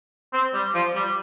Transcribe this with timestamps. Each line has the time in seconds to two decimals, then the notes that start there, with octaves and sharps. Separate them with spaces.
0.33 C4
0.54 G3
0.75 F3
0.96 G3